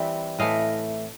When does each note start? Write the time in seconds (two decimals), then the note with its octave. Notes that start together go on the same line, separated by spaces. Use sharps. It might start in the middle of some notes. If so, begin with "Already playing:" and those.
Already playing: E3 G3 C4 E4
0.39 A2 E3 A3 D#5 F5